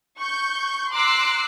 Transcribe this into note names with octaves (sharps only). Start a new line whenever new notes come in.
C#6 G6
A#5 C6 D6 E6 F#6 C7